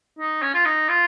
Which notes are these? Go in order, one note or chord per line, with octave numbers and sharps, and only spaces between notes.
D#4
C#4
F4
D#4
F4